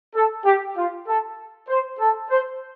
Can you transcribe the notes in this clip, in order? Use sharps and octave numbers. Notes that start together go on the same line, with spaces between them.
A4
G4
F4
A4
C5
A4
C5